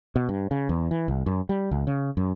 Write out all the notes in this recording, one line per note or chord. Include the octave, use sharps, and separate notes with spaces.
B2
G2
C#3
E2
E3
C2
F#2
G3
C#2
C#3
F#2